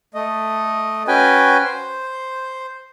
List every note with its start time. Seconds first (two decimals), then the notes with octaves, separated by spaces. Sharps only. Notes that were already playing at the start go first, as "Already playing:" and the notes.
0.14 A3 D#5
1.08 C#4 F#4 B4 G5 G#5
1.64 C5